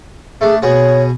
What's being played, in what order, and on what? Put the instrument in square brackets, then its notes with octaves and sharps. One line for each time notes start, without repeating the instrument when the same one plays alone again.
[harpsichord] A3 D4 [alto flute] G#4
[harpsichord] B2 F#4 G#4 [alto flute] C#5